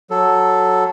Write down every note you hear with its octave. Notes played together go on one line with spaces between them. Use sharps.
F#3 A4